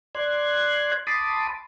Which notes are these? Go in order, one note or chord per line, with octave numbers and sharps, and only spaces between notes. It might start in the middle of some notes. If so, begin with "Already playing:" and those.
D5 C6 F#6 G#6
A5 B5 C6 D6 D#6